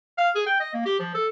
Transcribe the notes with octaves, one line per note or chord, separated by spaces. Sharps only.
F5
G#4
G5
D#5
A#3
G4
F3
A4